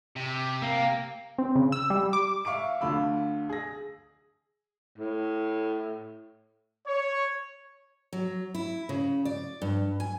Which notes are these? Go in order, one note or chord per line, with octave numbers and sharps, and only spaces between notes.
C3
A#3
C4
C#3
E6
G3
D6
E5 F5 C#6 D6 D7
D2 D3 F4 B5 E6
G#4 A#6
A2
C#5
F#3
E4
C#3
D5
G2
G#5